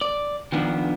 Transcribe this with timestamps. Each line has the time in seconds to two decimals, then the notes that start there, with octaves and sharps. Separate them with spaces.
0.01 D5
0.52 D#3 F3 B3 D4